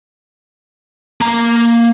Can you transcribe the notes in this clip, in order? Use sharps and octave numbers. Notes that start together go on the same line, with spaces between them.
A#3 A#5